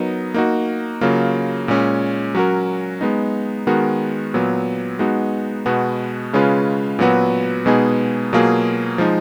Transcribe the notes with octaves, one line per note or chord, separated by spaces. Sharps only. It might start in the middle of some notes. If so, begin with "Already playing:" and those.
Already playing: F#3 B3 D#4 A#4
A#3 D#4 F#4
C#3 F#3 A#3 F4
A#2 G#3 C#4
F#3 C#4 F#4 A#4
G#3 B3 D#4
D#3 G#3 B3 F#4 A#4
A#2 F#3 B3
G#3 B3 D#4 F#4
B2 G#3 B3 F#4
C#3 G#3 C#4 F4 B4
A#2 F#3 B3 F#4 B4
B2 G#3 B3 D#4 G#4
B2 F#3 A#3 F4 G#4
F3 G#3 D#4